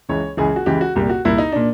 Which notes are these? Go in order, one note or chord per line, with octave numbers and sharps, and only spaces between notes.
C#2 C#3 E3 C#5
C#2 C#3 E3 G#4
F#4
C#2 C#3 E3 G4
F#4
C2 A#2 G4
F#4
C2 A#2 E4
D#4
A#2 D4